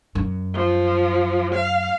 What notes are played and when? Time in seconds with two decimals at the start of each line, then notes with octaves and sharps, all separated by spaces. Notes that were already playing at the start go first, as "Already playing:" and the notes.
0.15 F#2
0.53 F3
1.55 F5